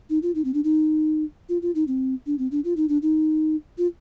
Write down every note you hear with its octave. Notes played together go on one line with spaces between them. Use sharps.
D#4
F4
D#4
C4
D4
D#4
F4
F4
D#4
C4
D4
C4
D4
F4
D#4
D4
D#4
F4